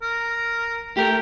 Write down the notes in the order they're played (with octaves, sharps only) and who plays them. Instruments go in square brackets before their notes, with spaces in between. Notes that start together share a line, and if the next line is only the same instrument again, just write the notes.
[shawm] A#4
[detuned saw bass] A3 [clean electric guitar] G4 A#4 [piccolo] G5